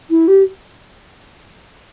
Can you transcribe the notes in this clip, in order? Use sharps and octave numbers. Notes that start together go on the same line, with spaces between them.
E4
G4